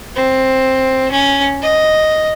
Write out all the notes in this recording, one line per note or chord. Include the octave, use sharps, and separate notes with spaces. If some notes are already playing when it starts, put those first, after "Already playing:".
C4
C#4
D#5